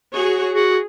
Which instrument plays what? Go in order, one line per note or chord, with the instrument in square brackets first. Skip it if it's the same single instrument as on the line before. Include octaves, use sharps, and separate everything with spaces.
[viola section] F#4 G#4 C#5
[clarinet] F#4 [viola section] G#4